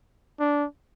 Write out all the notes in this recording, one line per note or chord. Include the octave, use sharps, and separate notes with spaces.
D4